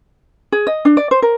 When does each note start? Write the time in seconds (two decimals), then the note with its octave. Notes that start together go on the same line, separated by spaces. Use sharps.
0.52 G#4
0.67 D#5
0.85 D4
0.97 D5
1.11 C5
1.22 A#4